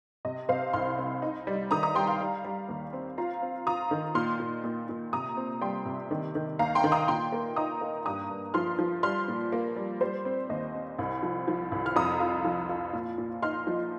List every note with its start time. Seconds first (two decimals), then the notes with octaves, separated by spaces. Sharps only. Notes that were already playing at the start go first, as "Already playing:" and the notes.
0.25 C3 D#5
0.48 C3 C5 F5
0.73 C2 C6 F6
0.98 C4
1.22 D#4
1.47 G3
1.71 D#3 A#5 D#6
1.83 A#5 D#6
1.95 G3 G5 C6
2.07 F5 A#5
2.20 G3
2.45 G3
2.69 D#2
2.93 C4
3.18 F4 F5 A#5
3.42 C4
3.67 F4 A#5 D#6
3.91 D#3
4.15 A#2 C6 F6
4.40 A#2
4.64 A#2
4.89 A#2
5.13 C3 A#5 D#6
5.37 C4
5.61 G3 G5 C6
5.86 C3
6.11 D#3
6.35 D#3
6.59 D#2 F5 A#5
6.75 G5 C6
6.84 D#3
6.92 A#5 D#6
7.08 A#2 G5 C6
7.32 A#3
7.56 D#4 A#5 D#6
7.81 A#3
8.06 G2 A#5 D#6
8.30 G2
8.54 F3 C6 F6
8.79 F3
9.03 G3 C6 F6
9.28 A#2
9.52 A#3
9.77 G3
10.01 G3 C5
10.25 C4
10.50 D#2 D#5
10.74 C4
10.99 C2
11.23 F3
11.48 F3
11.72 C2
11.86 F6
11.96 F2 A#5 D#6
12.20 F4
12.45 F3
12.69 F4
12.93 A#2
13.18 A#2
13.42 D#4 C6 F6
13.67 F3